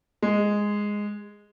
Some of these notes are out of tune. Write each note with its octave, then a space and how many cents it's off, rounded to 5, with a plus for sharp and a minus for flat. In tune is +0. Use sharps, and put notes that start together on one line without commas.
G#3 -5